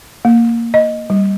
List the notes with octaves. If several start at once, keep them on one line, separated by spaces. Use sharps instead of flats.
A#3
D#5
G3